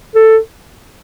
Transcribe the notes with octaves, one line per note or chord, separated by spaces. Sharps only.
A4